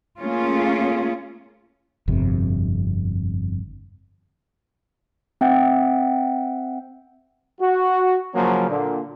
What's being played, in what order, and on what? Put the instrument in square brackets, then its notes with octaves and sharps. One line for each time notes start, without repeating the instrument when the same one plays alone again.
[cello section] A3 A#3 C#4 F4 G#4
[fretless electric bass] G1 F2 C3
[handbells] C4 E5 F#5 G5
[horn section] F#4
C#3 F3 F#3 A#3 C#4
A#2 D3